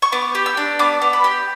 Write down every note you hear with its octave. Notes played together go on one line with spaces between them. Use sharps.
C#6
B3 D6
G4
E6
D4
B3 D6
B3
B5
G4